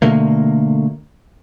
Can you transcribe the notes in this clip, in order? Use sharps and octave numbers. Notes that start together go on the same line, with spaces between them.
B2 D3 A3 A#3